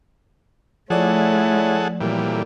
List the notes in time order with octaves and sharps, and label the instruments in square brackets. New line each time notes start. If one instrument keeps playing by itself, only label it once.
[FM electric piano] F3 D5 [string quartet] A3 [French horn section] E4 C#5 [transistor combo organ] G#4 A4 F#5
[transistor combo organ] A#2 E3 G3 [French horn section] F#3 C4 A4